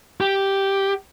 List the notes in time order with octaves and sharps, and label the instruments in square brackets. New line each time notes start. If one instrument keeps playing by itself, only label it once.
[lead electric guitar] G4